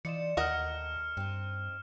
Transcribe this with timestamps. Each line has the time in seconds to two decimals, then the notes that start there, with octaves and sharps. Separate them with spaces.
0.05 E3 D#4 F4 D5 C#7 E7
0.37 D#2 A2 A#4 D#5 F#5 F6 E7
1.17 G2 C4 D#4